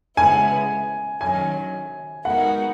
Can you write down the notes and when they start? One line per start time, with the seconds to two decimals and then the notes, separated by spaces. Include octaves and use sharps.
0.17 C#3 G#3 B3 E4 G#5
1.21 D#3 F#3 C#4 G#5
2.25 G#3 B3 D#4 F#4 A#4 F#5